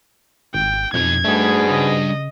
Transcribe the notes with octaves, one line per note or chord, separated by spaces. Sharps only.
G#1 G5
F2 B2 D#4 G#6
G#2 B2 G3 A3 D4 G#4
C#3 D#5